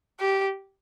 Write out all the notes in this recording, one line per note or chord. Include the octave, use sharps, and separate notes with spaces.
G4